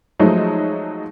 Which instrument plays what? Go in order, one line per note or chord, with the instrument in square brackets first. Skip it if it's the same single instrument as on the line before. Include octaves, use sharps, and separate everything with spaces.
[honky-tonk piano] F3 F#3 G#3 A3 D#4